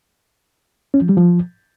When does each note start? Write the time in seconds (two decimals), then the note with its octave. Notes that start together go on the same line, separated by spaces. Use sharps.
0.94 C#4
1.02 F3
1.09 G3
1.17 F3